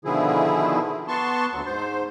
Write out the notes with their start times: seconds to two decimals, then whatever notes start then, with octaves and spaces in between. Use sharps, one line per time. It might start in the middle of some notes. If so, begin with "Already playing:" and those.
0.05 B2 D3 D#3 F3 E4 G#4
1.08 B3 A5 C6 C#6
1.52 D2 F#3
1.66 G#2 C5